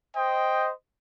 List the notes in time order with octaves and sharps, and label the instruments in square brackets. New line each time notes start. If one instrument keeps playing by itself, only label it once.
[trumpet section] C5 D#5 [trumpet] G5